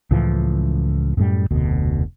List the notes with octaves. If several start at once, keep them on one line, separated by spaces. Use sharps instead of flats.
C#2 A2 E3 F3
F#2 A2 G3
F1 D2 B2